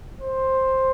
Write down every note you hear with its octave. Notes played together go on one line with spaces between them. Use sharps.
C5